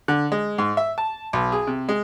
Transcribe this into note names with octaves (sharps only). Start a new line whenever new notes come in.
D3
G#3
G#2
E5
A5
B1
G#4
C3
G#3